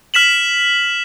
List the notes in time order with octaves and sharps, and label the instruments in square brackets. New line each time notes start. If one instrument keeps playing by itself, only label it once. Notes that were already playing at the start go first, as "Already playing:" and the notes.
[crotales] F6 B6 E7 F#7